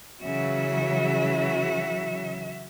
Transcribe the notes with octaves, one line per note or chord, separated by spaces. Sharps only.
C#3 E3 F#3 F#4 E5